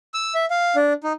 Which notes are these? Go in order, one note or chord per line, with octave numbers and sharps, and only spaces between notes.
E6
E5
F5
D4
D#4